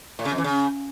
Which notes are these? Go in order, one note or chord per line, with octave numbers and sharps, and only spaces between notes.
A2
C#3
F2
E3
C#3